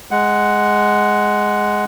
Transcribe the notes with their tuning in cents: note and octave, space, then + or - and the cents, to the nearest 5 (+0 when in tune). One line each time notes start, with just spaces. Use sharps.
G#3 +0 F#5 +5